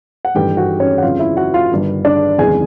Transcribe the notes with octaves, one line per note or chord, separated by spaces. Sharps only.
F#5
G#1 G2 E3 A3 G4 G5
F#4 F#5
C#4 C#5
F#5
G1 F2 C#3 F4 F5
E4 E5
F#4 F#5
F4 F5
G1 G2 D#3
D4 D5
F#1 E2 C3 D#3 G#3 G#4 G#5